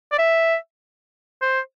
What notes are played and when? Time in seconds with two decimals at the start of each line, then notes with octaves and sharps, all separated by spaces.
0.12 D5
0.19 E5
1.42 C5